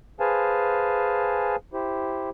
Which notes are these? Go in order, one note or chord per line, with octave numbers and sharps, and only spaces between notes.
G#4 B4 C5 F5 G#5 A5
E4 G4 C5